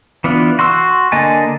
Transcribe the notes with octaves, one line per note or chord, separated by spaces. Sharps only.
E3 B3 D4 F4
F#4 C6 C#6 E6
D3 A#3 D#5 G#5 A5